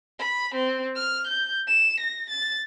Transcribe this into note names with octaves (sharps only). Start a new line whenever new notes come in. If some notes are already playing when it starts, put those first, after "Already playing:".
B5
C4
F6
G6
E7
A#6
A6